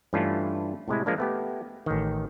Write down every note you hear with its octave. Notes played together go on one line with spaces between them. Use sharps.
G2 E3 A3 C#4 D4 F4
A2 C3 G#3 E4
F3 G#3 A#3 D4
A3 B3 G4
A1 D#3